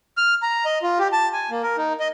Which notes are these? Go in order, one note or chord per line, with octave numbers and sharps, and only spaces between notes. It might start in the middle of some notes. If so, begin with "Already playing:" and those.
F6
A#5
D#5
F4
G4
A5
G#5
A#3
A#4
D#4
D#5